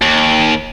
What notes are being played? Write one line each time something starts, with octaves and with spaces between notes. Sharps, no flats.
D#2